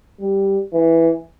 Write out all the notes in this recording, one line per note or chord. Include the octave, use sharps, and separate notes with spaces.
G3
E3